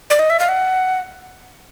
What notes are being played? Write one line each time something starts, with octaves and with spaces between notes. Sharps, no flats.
D5
D#5
E5
F5
F#5